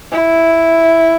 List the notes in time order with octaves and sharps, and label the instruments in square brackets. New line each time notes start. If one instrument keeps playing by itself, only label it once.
[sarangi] E4